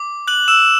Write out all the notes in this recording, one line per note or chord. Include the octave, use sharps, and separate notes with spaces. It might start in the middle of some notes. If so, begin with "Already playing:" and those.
Already playing: D6
F#6 F#7
E6 E7